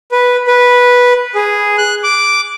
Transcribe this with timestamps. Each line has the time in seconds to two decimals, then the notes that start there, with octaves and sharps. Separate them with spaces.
0.12 B4
0.47 B4
1.35 G#4
1.78 F#6
2.04 D6